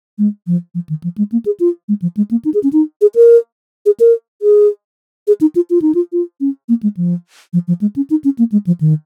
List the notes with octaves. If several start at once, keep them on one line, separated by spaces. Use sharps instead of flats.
G#3
F3
F3
D#3
F3
G#3
A#3
G#4
F4
G#3
F3
G#3
A#3
D#4
G#4
C#4
D#4
G#4
A#4
G#4
A#4
G#4
G#4
D#4
F4
F4
D#4
F4
F4
C#4
A#3
G#3
F3
F3
F3
G#3
C#4
D#4
C#4
A#3
G#3
F3
D#3